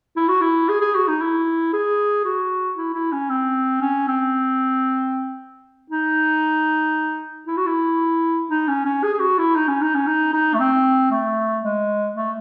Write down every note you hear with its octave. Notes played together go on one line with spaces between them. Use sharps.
E4
F#4
E4
G#4
G#4
F#4
D#4
E4
G#4
F#4
E4
E4
C#4
C4
C#4
C4
D#4
E4
F#4
E4
D#4
C#4
C#4
G#4
G#4
F#4
E4
D#4
C#4
D#4
C#4
D#4
D#4
A3
C4
A3
G#3
A3